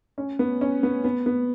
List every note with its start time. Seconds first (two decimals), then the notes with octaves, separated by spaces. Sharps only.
0.18 C#4
0.39 B3
0.61 C#4
0.83 B3
1.04 B3
1.26 B3